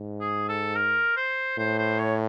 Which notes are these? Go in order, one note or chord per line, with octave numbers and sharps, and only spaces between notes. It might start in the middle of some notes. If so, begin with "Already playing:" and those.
Already playing: G#2
G#4
A4
A#4
C5
A2 C5
C5
C#5